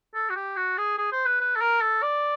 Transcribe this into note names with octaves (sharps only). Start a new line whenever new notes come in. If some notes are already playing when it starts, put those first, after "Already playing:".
A4
F#4
G4
F#4
G#4
G#4
C5
B4
B4
A4
A#4
A4
D5